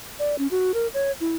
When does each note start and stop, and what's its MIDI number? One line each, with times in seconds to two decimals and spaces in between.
0.19 0.38 74
0.39 0.47 61
0.51 0.72 66
0.74 0.87 70
0.94 1.12 73
1.20 1.36 64